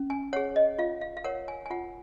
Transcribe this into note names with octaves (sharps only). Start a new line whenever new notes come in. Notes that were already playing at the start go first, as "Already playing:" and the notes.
Already playing: C#4
G#5
G#4 C#5 F#5
D#5
F4 F5
F5
F5
A#4 C#5 F#5
G#5
G#5
F4 F#5